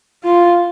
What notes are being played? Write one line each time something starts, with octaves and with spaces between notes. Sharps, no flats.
F4